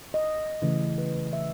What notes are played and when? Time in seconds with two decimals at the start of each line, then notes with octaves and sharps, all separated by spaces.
0.14 D#5
0.62 C#3 E3 A3
0.98 B4
1.33 E5